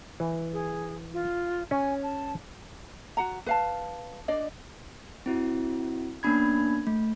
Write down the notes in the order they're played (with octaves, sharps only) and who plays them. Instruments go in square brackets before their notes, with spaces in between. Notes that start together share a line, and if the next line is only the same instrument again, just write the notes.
[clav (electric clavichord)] E3
[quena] G#4
F4
[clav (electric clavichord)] C#4 [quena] G#5
[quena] A5
[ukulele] F#4 F#5 A#5
B4 F5 A5
D4 D5 D#5
[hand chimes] C4 E4 F#4
A#3 B3 C#4 D4 B5 G#6
A3